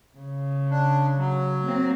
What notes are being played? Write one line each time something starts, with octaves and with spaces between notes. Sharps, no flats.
C#3
D4
F#3
A#3 C4